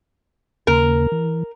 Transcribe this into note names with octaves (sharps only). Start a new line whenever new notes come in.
D#2 C#3 A#3 A#4
E3